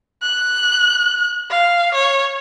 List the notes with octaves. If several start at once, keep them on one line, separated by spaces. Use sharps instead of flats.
F#6
F5
C#5